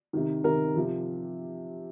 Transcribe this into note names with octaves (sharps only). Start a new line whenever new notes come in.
C3 D#3
C3 D#3 A#4
C3 F3